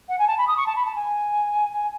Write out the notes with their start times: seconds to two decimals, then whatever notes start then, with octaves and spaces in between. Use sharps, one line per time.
0.08 F#5
0.18 G#5
0.27 A5
0.38 B5
0.47 D#6
0.57 C#6
0.66 A5
0.76 B5
0.85 A5
0.95 G#5
1.72 G#5